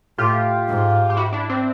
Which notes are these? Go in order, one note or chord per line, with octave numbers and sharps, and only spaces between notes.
A2 F4 G4
G#2
G4
E4 F#4
D4 E4
C4 D4